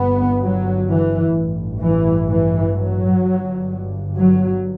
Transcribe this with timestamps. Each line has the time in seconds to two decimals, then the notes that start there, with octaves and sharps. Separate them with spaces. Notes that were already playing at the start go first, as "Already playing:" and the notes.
Already playing: G1 G2 B3
0.41 F#3
0.88 E3
1.35 A1 G2
1.81 E3
2.28 E3
2.74 F#3
3.21 G1 G2
4.14 F#3